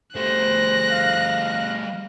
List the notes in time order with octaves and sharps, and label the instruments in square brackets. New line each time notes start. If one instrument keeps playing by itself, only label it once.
[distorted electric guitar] G3 A3 [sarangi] C5 [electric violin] F#6 A#6
[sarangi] F5